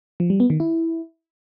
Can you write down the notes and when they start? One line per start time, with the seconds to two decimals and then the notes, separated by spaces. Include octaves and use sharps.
0.20 F3
0.30 G3
0.40 B3
0.50 D#3
0.60 E4